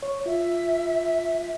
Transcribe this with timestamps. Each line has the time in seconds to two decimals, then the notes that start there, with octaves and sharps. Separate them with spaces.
0.03 C#5
0.26 F4 E5